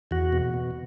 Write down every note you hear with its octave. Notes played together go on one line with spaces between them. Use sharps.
E2 F#4
B2
B2